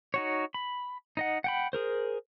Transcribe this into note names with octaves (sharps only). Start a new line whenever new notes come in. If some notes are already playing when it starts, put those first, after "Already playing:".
D#4 F#4 C#5
B5
D#4 D#5 F#5
F#5 G5 B5
G#4 A#4 C5